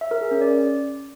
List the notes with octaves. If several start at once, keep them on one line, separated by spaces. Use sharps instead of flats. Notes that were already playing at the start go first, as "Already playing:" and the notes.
E5
A#4
G#4
C#4
D5